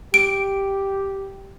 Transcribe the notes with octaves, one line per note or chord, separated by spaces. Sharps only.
G4 D7